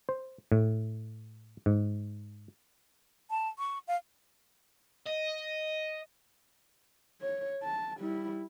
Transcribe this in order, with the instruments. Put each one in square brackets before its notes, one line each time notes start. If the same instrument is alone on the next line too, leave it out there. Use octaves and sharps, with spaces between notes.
[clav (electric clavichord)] C5
A2
G#2
[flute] A5
C#6
F5
[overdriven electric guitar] D#5
[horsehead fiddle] C#5
A5
G3 E4